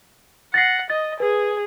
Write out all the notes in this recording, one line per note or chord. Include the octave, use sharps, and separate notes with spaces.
F#5 A6 A#6 C7
D#5 A6
G#4 B4